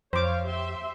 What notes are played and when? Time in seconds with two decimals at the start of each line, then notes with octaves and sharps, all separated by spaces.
0.13 F2 C5 C#5 F5 D6
0.46 G4 E5 C6